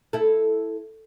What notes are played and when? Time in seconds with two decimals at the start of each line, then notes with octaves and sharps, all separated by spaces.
0.13 E4 A4